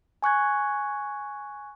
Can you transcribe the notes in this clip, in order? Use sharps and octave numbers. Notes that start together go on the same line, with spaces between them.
G#5 C#6 F#6 G#6